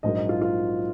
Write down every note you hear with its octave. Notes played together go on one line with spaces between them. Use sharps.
A#1 G#2 F#3 A#3 D#5
D#5
F4
F4